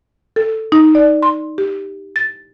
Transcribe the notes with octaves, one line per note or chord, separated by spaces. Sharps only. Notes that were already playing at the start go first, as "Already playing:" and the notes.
A4
D#4
D5
C6
G4
A6